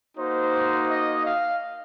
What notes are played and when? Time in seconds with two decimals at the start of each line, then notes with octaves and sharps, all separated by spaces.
0.17 A#3 D#4 F#4 C5
0.87 D#5
1.23 F5